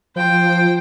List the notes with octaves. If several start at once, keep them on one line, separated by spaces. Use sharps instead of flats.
F3 C5 G5